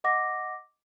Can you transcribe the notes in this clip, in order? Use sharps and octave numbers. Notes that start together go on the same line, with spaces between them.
D#5 F#5 D6 A#6